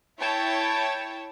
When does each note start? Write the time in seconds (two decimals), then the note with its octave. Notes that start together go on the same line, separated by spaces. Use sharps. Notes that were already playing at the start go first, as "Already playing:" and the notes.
0.18 E4 C#5 G5 A5